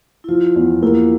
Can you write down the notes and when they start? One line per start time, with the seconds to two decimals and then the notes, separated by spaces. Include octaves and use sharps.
0.24 E4
0.28 F3 F4
0.56 E2
0.82 A#3 E4 G4